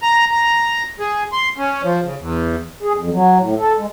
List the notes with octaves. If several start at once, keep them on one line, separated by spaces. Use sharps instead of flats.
A#5
A#5
G#4
C6
C#4
F3
C#3
E2
G#4
F2
F#3
A2
A4
G#3